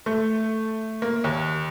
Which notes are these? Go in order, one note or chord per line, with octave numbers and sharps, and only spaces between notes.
A3
A#3
D#2